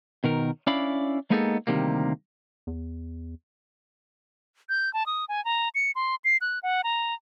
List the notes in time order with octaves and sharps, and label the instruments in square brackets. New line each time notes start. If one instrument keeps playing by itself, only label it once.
[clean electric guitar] B2 D#3 A#4
C#4 D4 E4 D5 F5 B5
G#3 A#3 B3 D#4 G#4 A4
D2 C3 D#3 G3 A#3
[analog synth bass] E2
[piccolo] G6
A5
D#6
G#5
A#5
C#7
C6
C7
F#6
F#5
A#5